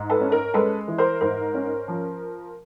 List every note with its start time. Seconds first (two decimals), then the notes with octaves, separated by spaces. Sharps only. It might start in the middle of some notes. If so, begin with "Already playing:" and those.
Already playing: G#2
0.10 A4 B4
0.21 C#4
0.32 A#4
0.54 G#3 A4 B4
0.88 E3
0.98 A#4 C5
1.21 G#2 A#4 C5
1.54 C#4
1.88 F3